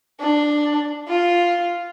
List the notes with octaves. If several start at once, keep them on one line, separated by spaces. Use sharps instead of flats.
D4
F4